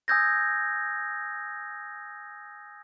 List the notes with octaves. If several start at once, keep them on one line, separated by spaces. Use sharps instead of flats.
G#5 D#6 E6 G6 G#6 A#6